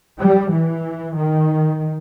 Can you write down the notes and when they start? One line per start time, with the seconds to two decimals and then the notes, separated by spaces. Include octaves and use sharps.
0.21 G3
0.54 E3
1.18 D#3